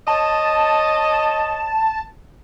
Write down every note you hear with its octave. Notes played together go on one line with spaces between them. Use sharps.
C#5 D#5 A5